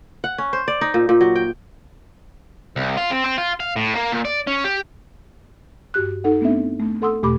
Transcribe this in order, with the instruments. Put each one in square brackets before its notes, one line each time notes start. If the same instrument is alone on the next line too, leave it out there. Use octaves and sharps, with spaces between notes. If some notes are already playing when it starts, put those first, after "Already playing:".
[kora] F#5
C#4
C5
D5
D#4
A#2
A#2
F#3
G5
[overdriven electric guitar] C2
F4
C4
C4
F4
F5
A2
A#3
A#2
D5
C#4
G4
[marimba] G2 F#4 G4 F#6
D#4 A4 F#5
A3 B3 C4 D4 E5
A3
A4 F#5 C6 D#6 E6
E2 B2 A3 G4 B5 D6